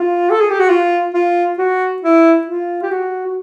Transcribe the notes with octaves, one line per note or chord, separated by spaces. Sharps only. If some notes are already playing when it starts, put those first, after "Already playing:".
Already playing: F4
A4
G#4
G4
F#4
F4
F4
F#4
E4
F4
G4
F#4
F#4